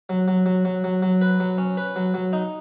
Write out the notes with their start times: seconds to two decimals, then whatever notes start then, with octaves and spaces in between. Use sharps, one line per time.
0.09 F#3
0.28 F#3
0.46 F#3
0.65 F#3
0.84 F#3
1.02 F#3
1.22 B4
1.40 F#3
1.58 C#4
1.77 B4
1.96 F#3
2.14 F#3
2.33 D#4